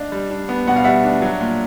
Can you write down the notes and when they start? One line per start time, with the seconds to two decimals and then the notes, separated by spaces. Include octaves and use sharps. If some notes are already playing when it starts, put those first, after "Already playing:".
Already playing: D4 D#5 F5
0.12 G3
0.30 D4
0.49 B3
0.67 B2 F#5
0.76 F5
0.84 G3 E5 F#5
1.04 D4
1.22 F#3
1.40 A#2